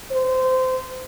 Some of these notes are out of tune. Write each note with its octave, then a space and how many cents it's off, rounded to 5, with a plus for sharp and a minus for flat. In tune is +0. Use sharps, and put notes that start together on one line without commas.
C5 -25